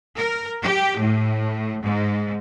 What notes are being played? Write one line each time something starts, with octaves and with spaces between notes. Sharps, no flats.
A#4
G4
A2
G#2